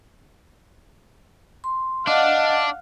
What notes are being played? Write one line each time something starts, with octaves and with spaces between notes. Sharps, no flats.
C6
D4 D#5 F5 F#5